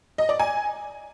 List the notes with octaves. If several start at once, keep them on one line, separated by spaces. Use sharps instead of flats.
D#5
D5
G#5